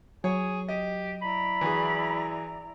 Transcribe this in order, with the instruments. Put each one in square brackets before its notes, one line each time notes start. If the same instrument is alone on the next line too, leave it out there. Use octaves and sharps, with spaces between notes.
[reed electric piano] F#3 [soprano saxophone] G#4 [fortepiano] C#5
[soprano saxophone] G4 [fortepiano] D#5
[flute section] E4 D5 A#5 [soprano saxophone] B5
[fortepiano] E3 F#4 G#4